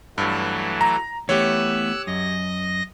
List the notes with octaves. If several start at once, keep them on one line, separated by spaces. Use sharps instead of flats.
G2 E3 F#3 A3
A#5
E3 A3 B3 G4 C#5 E6 F#6
F#2 D#5 A#6